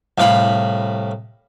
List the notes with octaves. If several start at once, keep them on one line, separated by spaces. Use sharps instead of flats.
C2 A2 F5 B5